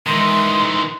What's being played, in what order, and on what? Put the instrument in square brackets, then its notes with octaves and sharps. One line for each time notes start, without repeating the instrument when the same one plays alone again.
[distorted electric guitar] D#3 E3 [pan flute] G#3 [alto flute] C6